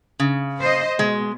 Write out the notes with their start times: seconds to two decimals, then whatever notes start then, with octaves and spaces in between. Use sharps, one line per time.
0.19 C#3
0.61 C5 D#5
0.99 B2 G#3